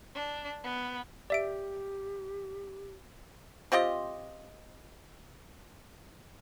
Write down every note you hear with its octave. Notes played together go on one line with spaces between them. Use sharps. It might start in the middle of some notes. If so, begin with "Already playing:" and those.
D4
B3
G4 D5 E5 D7
C4 F4 G4 D#5